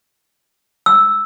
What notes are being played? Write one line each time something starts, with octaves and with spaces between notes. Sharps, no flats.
E6